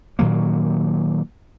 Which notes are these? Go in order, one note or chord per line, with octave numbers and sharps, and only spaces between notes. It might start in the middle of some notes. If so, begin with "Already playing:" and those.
A#2 D#3 F#3 A#3